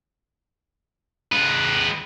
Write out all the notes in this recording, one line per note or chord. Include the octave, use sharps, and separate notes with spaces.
G#3 B4